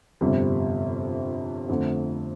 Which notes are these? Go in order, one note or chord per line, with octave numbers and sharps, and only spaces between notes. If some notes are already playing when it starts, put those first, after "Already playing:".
G1 F2 C3 G3
F2 D3 A3